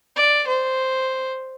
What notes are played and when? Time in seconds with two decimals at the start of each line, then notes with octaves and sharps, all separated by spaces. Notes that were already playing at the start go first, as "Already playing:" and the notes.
0.16 D5
0.47 C5